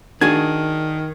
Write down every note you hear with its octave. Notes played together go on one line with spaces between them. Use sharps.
D#3 D4 F#4 G#4 G#6